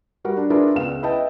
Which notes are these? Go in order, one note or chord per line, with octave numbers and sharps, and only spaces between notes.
G3 F#4 A#4 F#5
D4
D4 E4 F4 G#4 A#4 B4
C#2 B3 F5 E7
E4 B4 D#5 G5 A5